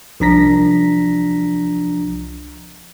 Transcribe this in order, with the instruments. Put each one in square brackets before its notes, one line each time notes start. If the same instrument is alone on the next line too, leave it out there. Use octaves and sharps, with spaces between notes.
[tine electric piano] C2 F3 D4 A#5 A#6 B6